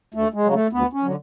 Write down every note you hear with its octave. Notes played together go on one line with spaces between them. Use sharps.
D2 A3
G#3
C#3 F#3
A3
D2 B3
C#4
D3 F#3